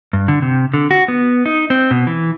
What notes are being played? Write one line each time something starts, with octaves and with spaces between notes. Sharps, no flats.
G2
D3
C3
D3
F#4
B3
D#4
C4
B2
E3